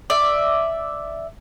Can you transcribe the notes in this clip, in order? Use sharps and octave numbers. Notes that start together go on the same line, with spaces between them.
D5 E5